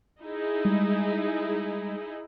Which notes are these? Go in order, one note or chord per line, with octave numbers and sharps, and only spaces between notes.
D#4 E4 G#4
G3 G#3